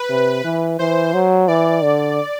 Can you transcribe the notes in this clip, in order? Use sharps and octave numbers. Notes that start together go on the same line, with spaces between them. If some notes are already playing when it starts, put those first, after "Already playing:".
Already playing: B4
C3
E3
E3 C5
F#3
E3 D5
D3